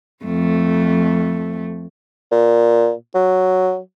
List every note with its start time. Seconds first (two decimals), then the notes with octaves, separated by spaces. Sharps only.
0.24 F2 A3
2.32 A#2
3.15 F#3